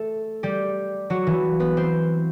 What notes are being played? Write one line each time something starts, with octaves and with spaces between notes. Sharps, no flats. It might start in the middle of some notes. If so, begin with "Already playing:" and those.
Already playing: A3 A4
G3 G4
F#3 F#4
E3 E4
B3 B4
C4 C5